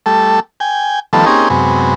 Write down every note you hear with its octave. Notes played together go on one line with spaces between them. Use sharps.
G3 A3 A4
G5 G#5
D#3 F3 G3 A3 B3 A4
A#3 C4 C#4 D#4 G4 G#4
F#2 C3 G#3 B3